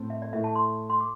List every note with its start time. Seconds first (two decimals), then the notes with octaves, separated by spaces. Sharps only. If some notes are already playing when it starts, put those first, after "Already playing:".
Already playing: A2 A3 C4 A4
0.10 E5
0.22 D5
0.33 A2 A3 E4 A4 E5
0.44 A5
0.55 C6
0.90 C6
1.00 D6